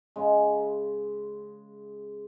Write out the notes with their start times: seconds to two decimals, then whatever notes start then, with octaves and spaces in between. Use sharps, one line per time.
0.16 C#3 G#3